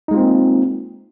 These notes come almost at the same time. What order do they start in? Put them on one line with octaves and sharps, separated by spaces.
D#4 G#3 F4 C4 A#3